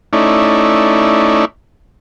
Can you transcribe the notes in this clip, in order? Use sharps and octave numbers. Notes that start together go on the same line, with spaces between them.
A3 C#4 D#4 E4 D5